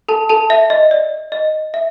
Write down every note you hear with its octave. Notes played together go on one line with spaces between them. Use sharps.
A4 A5
A4 A5
E5
D#5
D5
D#5
E5